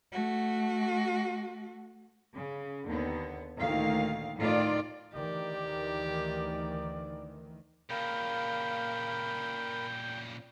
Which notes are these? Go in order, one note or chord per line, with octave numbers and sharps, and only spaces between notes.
A3 F#4
C#3
D#2 D3 B3
D2 A#2 D#3 F5
A2 D#3 A3 F4 D5
D2 D#3 E3 G4 D5
A#2 C#3 A#4 F5 G5 B5